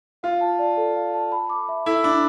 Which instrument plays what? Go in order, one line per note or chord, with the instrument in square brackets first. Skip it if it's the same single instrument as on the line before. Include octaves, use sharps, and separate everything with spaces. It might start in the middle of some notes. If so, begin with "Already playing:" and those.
[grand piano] F4 [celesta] F5
[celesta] A5
D5
A4
F5
A5
B5
D6
E5
[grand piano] E4 [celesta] A4
[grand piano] D4 [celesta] B5